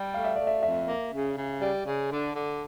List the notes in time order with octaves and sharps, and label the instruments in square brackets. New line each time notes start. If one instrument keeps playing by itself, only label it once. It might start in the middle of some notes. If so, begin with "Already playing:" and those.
Already playing: [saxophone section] G3 [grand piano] D5
[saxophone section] A3 [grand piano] F5
[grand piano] E5
[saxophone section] A3 [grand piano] D5
[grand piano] E5
[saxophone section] F2 [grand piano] E5
[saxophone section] A#3
C#3
C#3
[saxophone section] G3 [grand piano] D5
[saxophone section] C#3
D3
D3